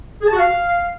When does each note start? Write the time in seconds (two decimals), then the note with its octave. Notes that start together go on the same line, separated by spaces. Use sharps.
0.21 G#4
0.27 A5
0.33 F#4
0.38 F5